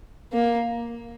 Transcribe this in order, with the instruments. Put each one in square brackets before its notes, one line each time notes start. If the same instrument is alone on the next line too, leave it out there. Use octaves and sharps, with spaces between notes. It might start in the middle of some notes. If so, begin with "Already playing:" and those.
[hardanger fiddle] A#3